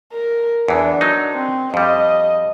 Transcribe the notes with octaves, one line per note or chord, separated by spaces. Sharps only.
A#4
E2 E3 D4
F#3 D#4
C4
F2 G3 D#5